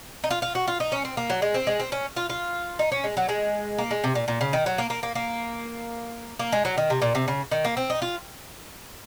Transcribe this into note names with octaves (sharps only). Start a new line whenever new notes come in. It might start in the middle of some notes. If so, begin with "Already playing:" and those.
D#4
F4
F4
F#4
F4
D#4
C#4
C4
A#3
F#3
G#3
C4
G#3
C4
C#4
F4
F4
D#4
C#4
G#3
F#3
G#3
A#3
G#3
C3
A#2
A#2
C#3
D#3
F#3
A#3
A#3
A#3
A#3
A#3
G#3
F#3
D#3
C3
A#2
C3
C#3
D#3
A#3
C4
D#4
F4